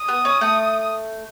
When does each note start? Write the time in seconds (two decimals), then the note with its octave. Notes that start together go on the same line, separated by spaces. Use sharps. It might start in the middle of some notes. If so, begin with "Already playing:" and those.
Already playing: D#6
0.08 B3
0.25 C#4
0.41 A3